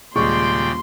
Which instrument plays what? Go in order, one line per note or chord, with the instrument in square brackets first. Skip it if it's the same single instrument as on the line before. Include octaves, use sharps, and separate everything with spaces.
[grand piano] D#1 G#3 C#6 [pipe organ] C#3 D5 G5 [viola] C6